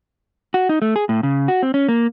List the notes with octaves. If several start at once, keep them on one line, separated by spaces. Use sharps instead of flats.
F#4
D#4
A3
G#4
A2
C#3
F#4
C4
C#4
A#3